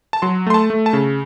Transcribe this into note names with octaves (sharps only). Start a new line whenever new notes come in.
A5
F#3 C6
A3 C6
A5
A3
A5
C#3